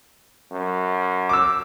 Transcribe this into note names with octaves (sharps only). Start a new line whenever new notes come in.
F#2
D6 E6